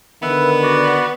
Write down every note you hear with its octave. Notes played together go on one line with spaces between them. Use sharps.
D3 D#3 B3 B4 E5
F#4 D5 F#5